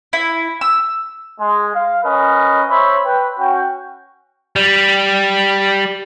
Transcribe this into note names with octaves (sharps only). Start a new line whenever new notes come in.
E4
E6
G#3
F5
C#4 A#4 B4 D#5
C5 C#5 E5 B5
B4 G5
C#4 F#4 G5
G3